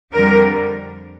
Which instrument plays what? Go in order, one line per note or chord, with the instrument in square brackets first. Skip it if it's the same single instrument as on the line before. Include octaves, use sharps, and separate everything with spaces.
[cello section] F2 D3 G3 A#4